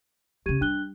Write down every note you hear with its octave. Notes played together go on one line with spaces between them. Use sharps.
E2 C#3 G4 G#6 D#7
G3 D4 F#6 G7